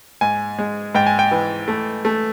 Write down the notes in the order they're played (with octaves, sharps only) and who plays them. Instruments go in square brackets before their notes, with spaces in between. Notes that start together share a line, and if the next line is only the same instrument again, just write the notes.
[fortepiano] G#2 [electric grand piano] G#5
[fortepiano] G#3
[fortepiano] G#2 [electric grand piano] G5
[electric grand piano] G#5
G5
[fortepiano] E3
A3
A3